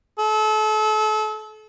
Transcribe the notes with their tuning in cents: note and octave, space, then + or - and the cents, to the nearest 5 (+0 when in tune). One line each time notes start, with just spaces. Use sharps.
A4 -35